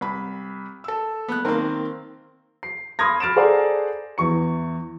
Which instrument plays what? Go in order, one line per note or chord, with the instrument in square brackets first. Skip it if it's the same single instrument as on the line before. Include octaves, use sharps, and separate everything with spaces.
[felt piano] C2 B5
A4 E6
[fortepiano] B3 F#6
[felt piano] D#3 C4 [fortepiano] A#3 A#4
[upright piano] C7
B5 C6 D#6 F6 G#6 A#6
B5 F6 A6 D7 E7
G#4 A4 C5 D5 F#5 A#5
E2 E3 C#6 C#7